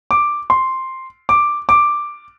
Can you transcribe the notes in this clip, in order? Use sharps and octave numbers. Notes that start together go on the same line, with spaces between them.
D6
C6
D6
D6